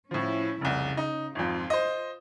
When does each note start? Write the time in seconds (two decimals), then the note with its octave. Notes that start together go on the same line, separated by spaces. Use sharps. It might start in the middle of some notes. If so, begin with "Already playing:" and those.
0.11 A2 F3 C#4 E4
0.61 F1 C2 C#3
0.97 D#4
1.35 G#1 F2 F4
1.70 C5 D#5